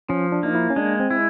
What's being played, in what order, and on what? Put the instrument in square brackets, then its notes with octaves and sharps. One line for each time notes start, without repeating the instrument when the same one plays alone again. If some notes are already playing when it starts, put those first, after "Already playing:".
[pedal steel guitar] F3 [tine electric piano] C#4
[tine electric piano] D4
[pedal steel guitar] A#3 [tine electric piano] D#4
[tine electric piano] E4
C#4
[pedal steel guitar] G#3 [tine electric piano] D4
[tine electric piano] C4
[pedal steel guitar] E4